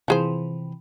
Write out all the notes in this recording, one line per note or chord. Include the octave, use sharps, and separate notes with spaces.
C3 E3 F3 G#4 C5